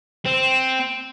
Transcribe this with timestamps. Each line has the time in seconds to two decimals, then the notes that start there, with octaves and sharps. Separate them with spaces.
0.26 C4